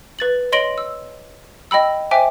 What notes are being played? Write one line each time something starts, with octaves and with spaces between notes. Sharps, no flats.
B4 A6 F#7
C#5 D#5 C6 A#6 D7 F#7
E6
D#5 G5 B5 E6
C5 E5 G5 G#5 D6